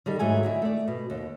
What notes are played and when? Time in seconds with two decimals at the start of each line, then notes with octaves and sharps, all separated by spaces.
0.06 D#3 G3 A4
0.19 G#2 F#3 A3 G#5
0.43 D3 D#3 E4
0.62 A3 D5
0.88 B2
1.10 D#2